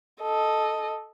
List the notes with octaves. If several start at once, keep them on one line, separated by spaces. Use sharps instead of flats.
A4 D#5